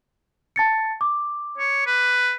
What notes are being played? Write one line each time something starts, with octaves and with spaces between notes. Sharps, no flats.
A5 A6 C#7
D6
C#5
B4